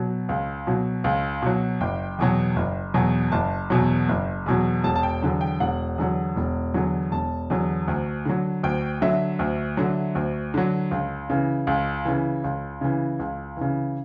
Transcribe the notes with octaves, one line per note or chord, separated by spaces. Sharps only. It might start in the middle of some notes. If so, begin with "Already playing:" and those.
Already playing: B2 F#3
C#2
B2 F#3
C#2
B2 F#3
F#1 G5
E2 B2 F#3
F#1
E2 B2 F#3
F#1 A5
E2 B2 F#3
F#1
E2 B2 F#3
E1 A5
A5
G5
E2 D3 F#3
G5
E1 F#5
E2 D3 F#3
E1
E2 D3 F#3
E1 A5
E2 D3 F#3
D2
D3 F#3
D2 G5
D3 F#3 E5
D2
D3 F#3
D2
D3 F#3
C#2
C#3 E3
C#2
C#3 E3
C#2
C#3 E3
C#2
C#3 E3